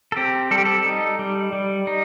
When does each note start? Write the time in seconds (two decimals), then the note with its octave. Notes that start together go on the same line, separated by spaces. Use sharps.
0.12 A4
0.17 C4 G4
0.51 G3 A4
0.58 G4
0.65 A4
0.85 D#4
1.19 G3
1.53 G3
1.87 D#4